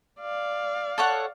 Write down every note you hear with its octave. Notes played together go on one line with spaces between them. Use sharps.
D5 F5
A4 C#5 F#5